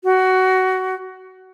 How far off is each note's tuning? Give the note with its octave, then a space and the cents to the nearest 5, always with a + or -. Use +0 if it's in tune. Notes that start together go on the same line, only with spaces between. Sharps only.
F#4 +15